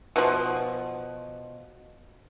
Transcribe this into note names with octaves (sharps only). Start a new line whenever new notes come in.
B2 F3